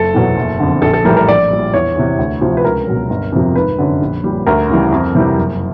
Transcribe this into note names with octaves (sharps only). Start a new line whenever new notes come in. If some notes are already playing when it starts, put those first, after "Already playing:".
Already playing: F#1 A4
E2 B2 F#3
F#1
F2 D3
A#1 A4
A4
A2 E3 G3 A#4
A#4
A#1 D5
A#2 G3
E2 C#5
C3 E3
D2
C3 F3
B4
C#2 A#4
B2 F#3
G1
F2 C3 F3
G#1 B4
F#2 D3
A#1
A#2 G3
D2 A#4
C#3 E3 G3
F2
C3 E3 G3
F#1